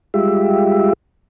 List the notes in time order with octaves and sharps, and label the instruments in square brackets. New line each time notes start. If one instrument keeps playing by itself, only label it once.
[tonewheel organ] G3 G#3 F4 G4 E5